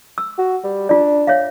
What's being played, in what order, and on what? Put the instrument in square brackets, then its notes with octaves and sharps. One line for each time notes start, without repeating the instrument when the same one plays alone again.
[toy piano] E6
[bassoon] F#4
G3
[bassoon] D4 [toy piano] F4 D5
[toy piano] C#5 E5 F5